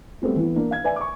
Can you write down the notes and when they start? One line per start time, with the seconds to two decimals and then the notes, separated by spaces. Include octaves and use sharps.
0.22 G3 A3 B3 C4 F#4
0.36 E3 B3 E4
0.56 A#3 D4
0.71 F5 G#6
0.84 B4 D5 E5 G#5
0.96 C#6 D6